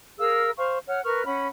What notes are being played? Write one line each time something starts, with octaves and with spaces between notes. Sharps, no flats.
G#4 A#4 F5 E6
C5 F5 C#6
C#5 F#5 F6
A#4 B4 C#6 F6
C#4 F#5 B5